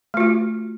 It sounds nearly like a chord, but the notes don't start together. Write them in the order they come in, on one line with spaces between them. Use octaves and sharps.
A3 F4 F#4